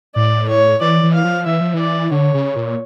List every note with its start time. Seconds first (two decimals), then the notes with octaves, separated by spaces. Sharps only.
0.15 A2 D5
0.49 C#5
0.81 E3 D5
1.03 E3
1.14 F5
1.25 F3
1.46 E3 E5
1.61 F3
1.74 E3 D5
2.11 D3 C#5
2.34 C#3
2.56 A#2